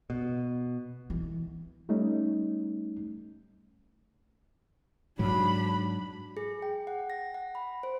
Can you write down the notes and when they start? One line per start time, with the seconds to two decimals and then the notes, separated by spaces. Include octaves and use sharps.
0.10 B2
1.10 E3
1.89 G3 A3 C#4 D#4
5.19 G#2 F#3 D4 B5
6.37 G#4
6.62 G5
6.87 F#5
7.10 A#6
7.34 F#5
7.55 B5
7.83 C5